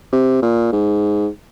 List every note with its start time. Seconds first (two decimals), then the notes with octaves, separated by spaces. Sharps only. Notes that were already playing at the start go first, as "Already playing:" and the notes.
0.13 C3
0.42 A#2
0.73 G#2